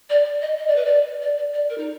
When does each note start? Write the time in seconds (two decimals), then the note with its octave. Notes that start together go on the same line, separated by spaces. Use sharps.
0.09 D5
0.25 D5
0.41 D#5
0.57 D#5
0.67 D5
0.75 B4
0.85 D5
1.21 D5
1.37 D5
1.53 D5
1.69 A#4
1.77 D#4